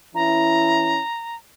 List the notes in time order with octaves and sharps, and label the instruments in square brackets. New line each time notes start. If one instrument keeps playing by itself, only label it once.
[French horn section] E3 C#4 E4 [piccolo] A#5